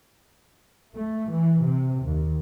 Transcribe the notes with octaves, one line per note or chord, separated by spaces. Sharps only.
A3
E3
C3
D#2